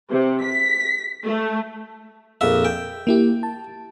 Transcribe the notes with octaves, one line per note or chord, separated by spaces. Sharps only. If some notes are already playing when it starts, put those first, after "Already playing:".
C3
B6
A3
A#1 F2 E5
G5
A#3 E4 G4
A5